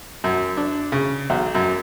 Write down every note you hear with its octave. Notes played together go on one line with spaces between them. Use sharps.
F#2
D4
C#3
B1
F#2